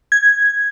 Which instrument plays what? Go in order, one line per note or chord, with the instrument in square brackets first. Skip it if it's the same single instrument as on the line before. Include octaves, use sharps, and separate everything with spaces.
[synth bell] G#6